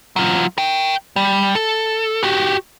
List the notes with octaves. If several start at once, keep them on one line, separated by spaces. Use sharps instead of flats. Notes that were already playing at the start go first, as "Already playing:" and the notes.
F#3 F4
A#4 G5
G3
A4
F#4 G4